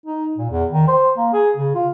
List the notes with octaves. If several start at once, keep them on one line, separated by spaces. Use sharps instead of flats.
D#4
A#2
E2
D#3
C5
A#3
G#4
C#3
F4